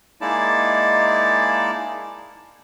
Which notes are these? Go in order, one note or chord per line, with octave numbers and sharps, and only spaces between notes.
G#3 A#3 D#4 E4 D5 A5